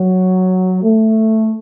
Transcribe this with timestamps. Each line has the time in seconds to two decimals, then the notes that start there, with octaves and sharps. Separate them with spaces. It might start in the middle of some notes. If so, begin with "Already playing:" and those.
Already playing: F#3
0.83 A3